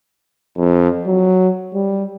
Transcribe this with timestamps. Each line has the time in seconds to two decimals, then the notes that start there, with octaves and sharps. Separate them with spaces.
0.57 F2
1.06 F#3
1.74 G3